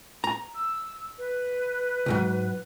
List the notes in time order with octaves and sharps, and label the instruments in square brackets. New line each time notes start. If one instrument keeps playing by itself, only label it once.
[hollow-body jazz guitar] A#5
[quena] E6
B4
[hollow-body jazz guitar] C2 G#2 F#3